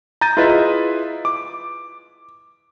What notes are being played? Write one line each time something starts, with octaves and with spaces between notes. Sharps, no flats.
A#5 G6 A6 D#7
E4 F4 G#4 B4 D#5 E5
D6